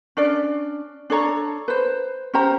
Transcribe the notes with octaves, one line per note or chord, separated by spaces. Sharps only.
C#4 D4 D5
D4 A4 C#5 A#5
B4 C5
C#4 G4 C5 A#5